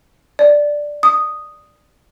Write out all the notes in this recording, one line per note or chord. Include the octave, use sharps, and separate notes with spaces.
D5
D#6